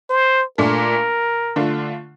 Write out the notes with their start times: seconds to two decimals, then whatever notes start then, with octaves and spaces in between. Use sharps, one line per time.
0.10 C5
0.58 A#2 A3 D4 A#4
1.56 D3 A3 D4 F4